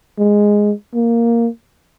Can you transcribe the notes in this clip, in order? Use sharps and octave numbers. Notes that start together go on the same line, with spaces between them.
G#3
A#3